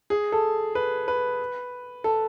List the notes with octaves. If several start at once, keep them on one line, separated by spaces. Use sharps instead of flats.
G#4
A4
B4
B4
A4